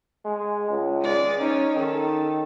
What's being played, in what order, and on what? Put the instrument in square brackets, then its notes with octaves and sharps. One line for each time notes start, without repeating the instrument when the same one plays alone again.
[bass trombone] G#3
C#2
[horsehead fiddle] G#3 D5
[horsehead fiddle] C#4 C#5 [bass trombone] D#4
[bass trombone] D#3 [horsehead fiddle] A4